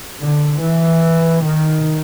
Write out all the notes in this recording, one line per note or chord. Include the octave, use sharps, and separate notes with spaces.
D3
E3
D#3